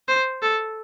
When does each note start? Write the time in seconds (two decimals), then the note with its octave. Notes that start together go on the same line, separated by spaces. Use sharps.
0.08 C5
0.42 A4